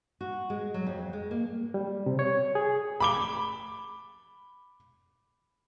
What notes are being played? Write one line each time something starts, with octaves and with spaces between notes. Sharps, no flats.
F#4
G#3
F#3
F2
G#3
A#3
G3
C3
C#5
G#4
B5 D6 G7